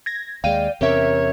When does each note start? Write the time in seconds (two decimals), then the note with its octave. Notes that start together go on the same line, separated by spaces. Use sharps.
0.06 G#6 A#6
0.44 D#2 G#3 D5 F5 G5 D#7
0.81 E2 C3 C#4 G4 A#4 C#5 E5